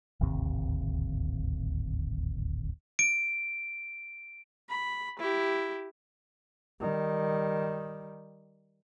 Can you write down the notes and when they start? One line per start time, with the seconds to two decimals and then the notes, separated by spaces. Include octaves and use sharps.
0.21 D1 G#1 D#2 C3
2.99 D7
4.69 B5
5.19 E4 G4
6.80 D#3 G3